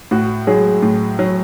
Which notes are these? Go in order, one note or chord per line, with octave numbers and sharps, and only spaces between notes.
A2 F#4
F#3 G#3 G#4
A2
F#3